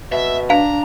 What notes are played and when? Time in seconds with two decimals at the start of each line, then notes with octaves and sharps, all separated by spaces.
0.12 B2 E5
0.50 D4 F5 A#5